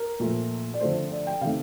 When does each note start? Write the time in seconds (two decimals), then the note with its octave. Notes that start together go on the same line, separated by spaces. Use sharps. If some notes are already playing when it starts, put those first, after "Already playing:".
Already playing: A#4
0.20 A#2 F3 A3
0.74 D5
0.80 D3 F3 A3 C5
1.12 D5
1.27 G5
1.41 C3 D#3 A3 F5